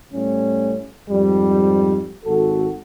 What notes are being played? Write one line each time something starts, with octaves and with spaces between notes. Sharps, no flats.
A2 G3 A3 C#4
F2 G#2 G3
G#1 F#4 A4